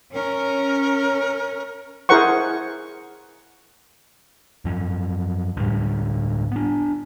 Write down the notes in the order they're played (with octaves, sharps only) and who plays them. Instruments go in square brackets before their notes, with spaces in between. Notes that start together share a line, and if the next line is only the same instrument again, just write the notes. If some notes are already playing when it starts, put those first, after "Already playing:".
[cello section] C#4 [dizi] A#4
[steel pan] E4 G#4 A#4 C5 F#5 C#6
[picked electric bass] F#2 F3
D2 A2 G3
B3 D4